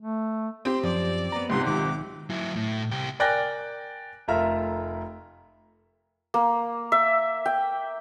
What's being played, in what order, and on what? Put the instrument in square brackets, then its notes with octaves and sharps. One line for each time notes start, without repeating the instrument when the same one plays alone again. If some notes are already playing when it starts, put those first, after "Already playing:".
[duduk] A3
[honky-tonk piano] C4 G4 [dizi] C6
[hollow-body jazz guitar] F#2 F3 [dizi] D5
[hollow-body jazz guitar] B3 A#5
[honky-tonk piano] C#2 G#2 C3 [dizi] C6
[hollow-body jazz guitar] B1 D#3 [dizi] D6
[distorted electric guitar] F#3 E4
A2
C2 G4
[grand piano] A#4 D5 G5 G#5 F#6 A#6
F1 A3 F4 A#4 E5 A#5
[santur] A#3
E5
G5